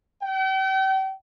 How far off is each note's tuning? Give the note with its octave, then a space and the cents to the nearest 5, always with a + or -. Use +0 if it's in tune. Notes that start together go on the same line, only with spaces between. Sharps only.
G5 -40